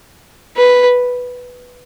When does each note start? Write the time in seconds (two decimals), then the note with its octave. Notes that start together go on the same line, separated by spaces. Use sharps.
0.56 B4